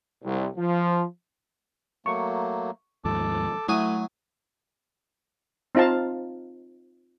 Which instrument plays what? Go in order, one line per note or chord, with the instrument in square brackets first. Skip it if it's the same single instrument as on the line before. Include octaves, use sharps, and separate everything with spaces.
[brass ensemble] C2
F3
[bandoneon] F#3 A3 A#3 [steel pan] C#6
[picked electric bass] D#2 G#2 F3 [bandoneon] A4 A5 D6
[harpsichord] F#3 G#5 [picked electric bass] A3 [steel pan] E4 D#6
[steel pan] C4 D#4 F4 F5 A5